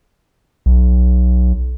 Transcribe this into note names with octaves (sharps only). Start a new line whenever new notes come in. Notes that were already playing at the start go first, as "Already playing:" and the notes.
B1